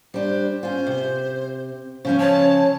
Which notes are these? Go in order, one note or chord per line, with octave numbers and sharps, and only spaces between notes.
G3 D4 C5
C#4 F4 C5
C3
C#3 F3 C#4 C5
C#5 A5